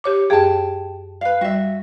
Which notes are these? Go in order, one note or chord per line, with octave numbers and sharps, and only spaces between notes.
G4 C#5 D6
F#2 G4 G#4 G5 A5
B4 F5
G3 F#4 E5